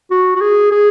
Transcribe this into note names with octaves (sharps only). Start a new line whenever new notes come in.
F#4
F#4
G#4
G#4